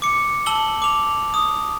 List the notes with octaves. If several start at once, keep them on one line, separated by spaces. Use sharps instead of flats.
D6 C#7
A5 E6 F#7 G7
D6 F7
D#6